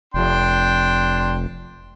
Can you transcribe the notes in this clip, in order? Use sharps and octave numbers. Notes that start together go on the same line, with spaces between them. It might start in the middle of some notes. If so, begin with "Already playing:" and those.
F1 D4 G5 C6